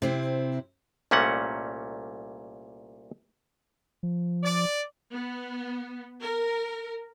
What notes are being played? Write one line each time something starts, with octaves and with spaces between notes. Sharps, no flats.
C3 C4 E4
C2 A#2 A3 A#3 C#4 F#5
F3
D5
B3
A#4